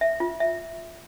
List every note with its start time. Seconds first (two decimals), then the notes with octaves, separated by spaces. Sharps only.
0.01 E5
0.20 F4
0.40 E5